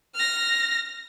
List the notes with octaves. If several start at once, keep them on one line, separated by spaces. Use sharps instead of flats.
F6 A#6